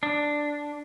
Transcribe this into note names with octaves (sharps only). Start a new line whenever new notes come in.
D4